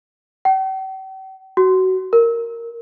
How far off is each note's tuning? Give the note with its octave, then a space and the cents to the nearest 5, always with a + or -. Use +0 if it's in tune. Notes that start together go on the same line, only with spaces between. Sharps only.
G5 -45
F#4 +20
A#4 -5